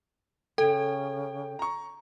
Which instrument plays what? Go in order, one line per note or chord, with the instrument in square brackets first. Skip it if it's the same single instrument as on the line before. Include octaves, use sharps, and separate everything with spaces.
[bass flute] C#3 [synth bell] A4 [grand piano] G5
[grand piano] A#5 C#6